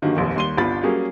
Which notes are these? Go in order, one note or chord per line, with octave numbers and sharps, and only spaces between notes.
G2 D3 D#3 F#3 A#3
F1 A#1 D#2
D#2 G3 C6 D#7 G7
G1 C2 D4 F4 B5 A6
F#3 G3 A#3 C#4 G#4